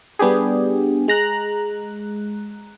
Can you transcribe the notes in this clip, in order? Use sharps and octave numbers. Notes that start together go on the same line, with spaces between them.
G3 B3 D4 G4 G#4
G#3 A#5 F#6